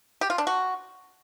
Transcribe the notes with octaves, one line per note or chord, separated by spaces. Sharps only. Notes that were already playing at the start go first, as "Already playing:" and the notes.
G4
F4
D4
F#4